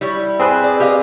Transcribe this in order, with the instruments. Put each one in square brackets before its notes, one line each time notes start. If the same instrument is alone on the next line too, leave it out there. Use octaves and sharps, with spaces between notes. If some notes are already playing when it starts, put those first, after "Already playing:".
[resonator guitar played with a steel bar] G3 E4 C#5
[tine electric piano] C4 G#4 B4
[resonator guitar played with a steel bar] D5
G4 D#5 F5